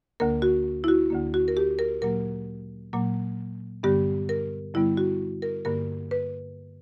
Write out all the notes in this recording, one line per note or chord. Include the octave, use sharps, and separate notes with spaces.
D2 D3 A#3 A#4
F#4
E4
F#4
D2 D3 A#3
F#4
A#4
G4
A#4
A#2 F#3 A#3 A#4
A#2 F#3 A#3
G2 D3 G3 B3 G4
A#4
G2 D3 G3 B3 E4
F#4
A#4
G2 D3 A#3 A#4
B4